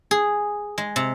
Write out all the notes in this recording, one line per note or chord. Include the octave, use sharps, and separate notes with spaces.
G#4
G#3
C3